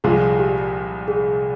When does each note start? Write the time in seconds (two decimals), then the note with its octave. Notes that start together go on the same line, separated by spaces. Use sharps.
0.04 C2 A#2 F3 G#3 G#4
0.39 G4
1.08 G#4